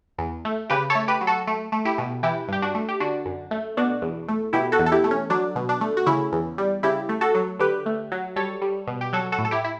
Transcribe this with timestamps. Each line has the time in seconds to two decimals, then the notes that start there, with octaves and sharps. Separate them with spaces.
0.18 E2
0.45 A3
0.70 C#3 G4 B4
0.90 A4 C#5
0.95 A3
1.08 G4 B4
1.21 F#3
1.27 F#4 A4
1.47 A3
1.72 A3
1.85 E4 G4
1.98 B2
2.23 E3 E4 G4
2.48 G2 G4
2.62 D4 F#4
2.75 A3
2.89 G4
3.00 D3 D4 F#4
3.25 F#2
3.51 A3
3.77 B2 D4 F#4
4.02 E2
4.28 A3
4.53 B2 E4 G4
4.72 F#4 A4
4.79 E2
4.86 A4
4.92 E4 G4
5.04 A3
5.11 C#4
5.30 F#3 D4
5.56 B2
5.69 D4
5.81 A3
5.97 F#4
6.06 C#3 C#4 E4
6.32 E2
6.58 G3
6.83 C#3 E4 G4
7.09 A3
7.21 F#4 A4
7.35 F#3
7.59 D3 G4 B4
7.86 A3
8.12 F#3
8.36 G3 A4 C#5
8.62 G3
8.87 B2
9.01 G4
9.13 F#3 F#4 A4
9.32 F#4 A4
9.38 A2
9.45 A4
9.51 E4 G4
9.64 E4